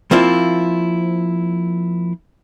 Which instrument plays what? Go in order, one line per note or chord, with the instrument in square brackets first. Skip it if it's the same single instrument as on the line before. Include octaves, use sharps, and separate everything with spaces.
[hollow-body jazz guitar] F3 A#3 C4 E4 F4